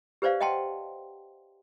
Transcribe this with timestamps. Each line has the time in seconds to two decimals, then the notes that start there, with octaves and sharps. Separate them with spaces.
0.22 G4 B4 C5 D5 F5
0.41 D#5 F#5 G5 A5 C6